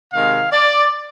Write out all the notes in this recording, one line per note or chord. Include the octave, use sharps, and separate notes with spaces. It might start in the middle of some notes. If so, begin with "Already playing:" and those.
C3 D#3 G#3 F5
D5